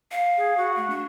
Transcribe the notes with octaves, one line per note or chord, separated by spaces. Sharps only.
F5
G#4
F#4
A3
D4